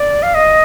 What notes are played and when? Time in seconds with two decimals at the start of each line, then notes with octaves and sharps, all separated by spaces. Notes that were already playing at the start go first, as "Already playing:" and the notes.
Already playing: D5
0.23 F5
0.34 D#5